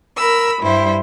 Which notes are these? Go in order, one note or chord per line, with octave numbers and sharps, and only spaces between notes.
A#4 B5 E6
G2 G3 E4 C5